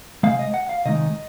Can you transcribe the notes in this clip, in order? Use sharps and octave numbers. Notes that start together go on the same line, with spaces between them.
C3 D#3 G#3 F5
D#5
F#5
F5
C3 D#3 G#3 D#5